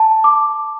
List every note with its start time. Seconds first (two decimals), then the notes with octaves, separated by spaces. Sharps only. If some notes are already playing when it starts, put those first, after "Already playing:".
Already playing: A5
0.24 D6